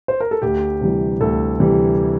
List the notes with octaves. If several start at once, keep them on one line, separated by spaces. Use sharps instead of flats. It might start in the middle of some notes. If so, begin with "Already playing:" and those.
C5
A#4
A4
D2 G4
C3 E3 G3
D2 A4
C3 E3 G3